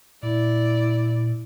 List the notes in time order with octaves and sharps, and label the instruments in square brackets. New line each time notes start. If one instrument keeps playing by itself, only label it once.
[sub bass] A#2 [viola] E4 D5